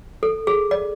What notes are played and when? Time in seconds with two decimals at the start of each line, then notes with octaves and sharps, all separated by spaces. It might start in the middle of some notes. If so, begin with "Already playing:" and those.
0.23 A4
0.47 G#4
0.71 D5